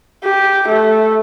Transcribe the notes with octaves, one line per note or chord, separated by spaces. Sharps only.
G4
A3